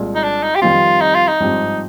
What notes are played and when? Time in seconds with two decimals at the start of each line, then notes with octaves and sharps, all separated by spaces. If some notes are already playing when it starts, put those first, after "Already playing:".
Already playing: C2 A#2 G#3
0.15 D#4
0.23 D4
0.43 D#4
0.55 G4
0.61 F2 D#3 G3 C4 F4
1.01 D#4
1.15 F4
1.28 D#4
1.40 G#1 G2 F3 C4 G4